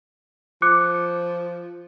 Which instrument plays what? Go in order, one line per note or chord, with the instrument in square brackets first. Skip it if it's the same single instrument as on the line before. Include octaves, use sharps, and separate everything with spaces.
[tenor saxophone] F3 [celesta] D6 F#6 C#7